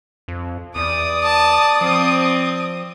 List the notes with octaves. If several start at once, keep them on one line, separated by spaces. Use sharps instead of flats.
F2
E2 D5 D#6
A5
F3 C4